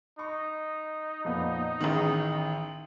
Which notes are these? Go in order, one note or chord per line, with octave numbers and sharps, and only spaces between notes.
D#4 C#6
F2 A#2 B3
A1 D#3 B3 C#4 G#4